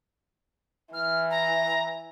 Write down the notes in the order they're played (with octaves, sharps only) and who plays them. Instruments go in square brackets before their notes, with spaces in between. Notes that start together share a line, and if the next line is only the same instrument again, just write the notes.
[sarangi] E3 [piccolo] F6
[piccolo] A#5